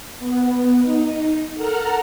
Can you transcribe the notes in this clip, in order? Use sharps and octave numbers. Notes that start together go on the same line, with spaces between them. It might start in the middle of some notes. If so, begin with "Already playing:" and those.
B3
D#4
A4 A#4 F#5 A#5 F6